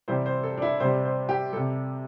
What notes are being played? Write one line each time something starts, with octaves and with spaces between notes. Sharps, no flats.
C3 E3 G3 C5
C5
A4
D4
E4
C3 G3 C5
C5
G4
C3 G3 A4